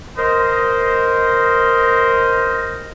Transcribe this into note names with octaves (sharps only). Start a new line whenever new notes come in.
A#4 C5 D#5